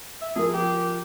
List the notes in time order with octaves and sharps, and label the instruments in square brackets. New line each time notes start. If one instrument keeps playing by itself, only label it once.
[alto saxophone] E5
[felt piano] F3 A#4 [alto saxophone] G#4
[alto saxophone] G4